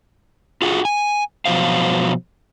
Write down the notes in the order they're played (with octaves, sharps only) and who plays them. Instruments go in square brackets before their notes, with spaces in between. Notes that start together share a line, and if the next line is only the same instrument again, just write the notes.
[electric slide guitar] F4 F#4 G#4
G#5
B2 F3 F#3 C5 F5